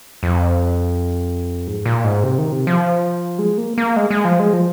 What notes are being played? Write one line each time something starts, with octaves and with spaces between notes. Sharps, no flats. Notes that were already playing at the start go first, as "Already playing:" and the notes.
F2
G#2
A#2
G#2
C3
D#3
C3
F3
G#3
A#3
A#3
G#3
G#3
F3
G#3
F3